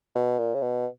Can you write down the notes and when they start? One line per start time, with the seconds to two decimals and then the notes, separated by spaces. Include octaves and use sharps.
0.16 B2
0.39 A#2
0.54 C#3
0.62 B2